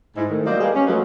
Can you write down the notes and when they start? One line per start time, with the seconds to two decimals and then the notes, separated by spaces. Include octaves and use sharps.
0.16 G#2 E4
0.29 D#3 A3
0.45 F#3 G3 A#3 C5 D5 D#5
0.60 G3 G#3 A#3 G4 G#4 B4
0.75 C#4
0.87 F3 F#3 G#3 A3 B3